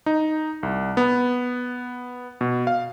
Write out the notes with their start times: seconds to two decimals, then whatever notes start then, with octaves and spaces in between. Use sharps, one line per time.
0.06 D#4
0.63 C2
0.97 B3
2.41 B2
2.67 F5